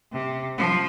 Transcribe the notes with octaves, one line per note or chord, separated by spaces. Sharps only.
C3
F3